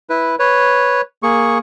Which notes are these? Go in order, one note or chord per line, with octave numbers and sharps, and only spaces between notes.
E4 B4
B4 C#5
A#3 G#4 C#6